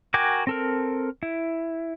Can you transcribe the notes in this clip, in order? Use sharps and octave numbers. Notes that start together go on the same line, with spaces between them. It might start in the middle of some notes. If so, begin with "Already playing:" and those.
F#4 A#4 G5 G#5 D6
C4 A4 A#4
E4